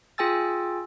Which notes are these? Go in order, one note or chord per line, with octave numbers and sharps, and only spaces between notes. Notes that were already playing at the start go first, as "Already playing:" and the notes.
F4 G#4 G5 G#5 E6 A6